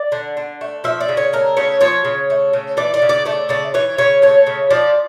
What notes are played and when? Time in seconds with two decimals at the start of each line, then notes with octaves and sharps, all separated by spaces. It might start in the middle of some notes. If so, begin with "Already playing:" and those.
Already playing: D5
0.12 D3
0.37 D3
0.61 A3
0.84 F3 E5
1.00 D5
1.09 C#3
1.17 C#5
1.33 A3 A#4
1.57 C#3 C#5
1.81 F3 C#5
2.05 C#3
2.30 A3
2.53 C#3
2.77 E3 D5
2.94 D5
3.02 C#3
3.09 D5
3.26 A3 D5
3.49 C#3 D5
3.74 E3 C#5
3.98 C#3 C#5
4.22 A3 C#5
4.47 C#3
4.70 F3 D5